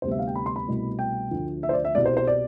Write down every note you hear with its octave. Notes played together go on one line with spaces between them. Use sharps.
D2 C3 G3 B3 C5
E5
F5
G5
B5
C6
B5
C2 B2 A3
G5
D2 D3 F3 A3
E5
C5
D5
E5
C2 B2 G3 D5
C5
C5
D5